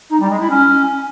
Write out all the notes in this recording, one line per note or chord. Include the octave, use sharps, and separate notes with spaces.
D#4
G3
G#3
E4
C#4